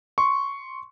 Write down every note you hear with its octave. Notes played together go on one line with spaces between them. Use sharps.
C6 C#6